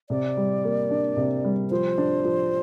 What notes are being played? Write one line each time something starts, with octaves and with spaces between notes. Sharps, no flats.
C3 D5
G3
A#3
D4
C3
G3
F3 C5
D4
F3